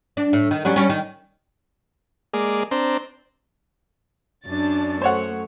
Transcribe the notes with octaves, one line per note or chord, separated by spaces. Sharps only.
D4
A2
D#3
F#3 G3 C#4
G3 C#4
D#3
G#3 A#3 G#4 D5
C4 D4 C5 A#5
F#2 D4 A6
A3 C5 C#5 F#5